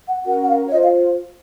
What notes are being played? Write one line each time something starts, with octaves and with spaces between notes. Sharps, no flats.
F#5
C#4 F#4 A#4 F#5
F#5
F5
C#5
F4 C5 D#5
F5